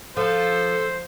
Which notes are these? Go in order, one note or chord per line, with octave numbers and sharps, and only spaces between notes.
F3 A4 C5